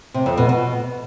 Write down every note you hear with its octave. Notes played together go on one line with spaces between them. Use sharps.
C3
F2
B2
B2